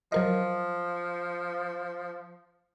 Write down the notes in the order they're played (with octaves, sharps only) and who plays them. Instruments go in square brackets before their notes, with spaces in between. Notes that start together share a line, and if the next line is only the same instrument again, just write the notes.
[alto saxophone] F3 [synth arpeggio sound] F#3 A#4 D#5